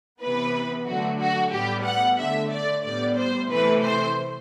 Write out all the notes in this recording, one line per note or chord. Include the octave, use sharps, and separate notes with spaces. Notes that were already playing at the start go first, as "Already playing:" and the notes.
C3 E3 B3 B4
D3 F#3 A3 F#4
F#4
A2 G3 B3 G4
F#5
D3 A3 E5
D5
A2 G3 B3 D5
C5
C3 E3 A3 B4
C5